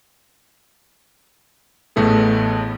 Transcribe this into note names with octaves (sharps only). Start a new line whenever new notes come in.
A1 A2 A3 B3 G#4